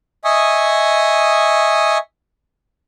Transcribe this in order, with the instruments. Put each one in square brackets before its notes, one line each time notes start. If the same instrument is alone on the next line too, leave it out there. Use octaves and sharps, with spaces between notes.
[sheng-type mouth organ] D#5 E5 G#5 C#6 D#6